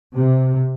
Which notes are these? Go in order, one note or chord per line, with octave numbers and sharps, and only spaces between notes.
C3